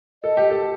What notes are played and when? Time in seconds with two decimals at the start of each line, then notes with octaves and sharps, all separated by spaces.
0.24 A4 D#5
0.37 G4
0.50 A4